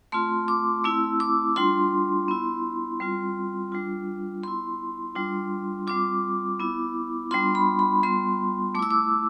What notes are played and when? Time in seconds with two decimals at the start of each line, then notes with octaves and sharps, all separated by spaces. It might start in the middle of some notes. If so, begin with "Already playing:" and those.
0.12 A3 C4 F4 C6
0.48 D6
0.84 A3 C4 E4 E6
1.20 D6
1.56 G3 D4 F4 C6
2.28 B3 E4
3.00 G3 C4 F4
3.72 G3 D4 F4
4.43 B3 E4 C6
5.15 G3 D4 F4
5.87 G3 C4 F4 D6
6.60 B3 E4
7.31 G3 B3 D4 F4 C6
7.55 B5
7.79 B5
8.03 G3 B3 F4 C6
8.75 A3 D6
8.79 E4 E6
8.91 D6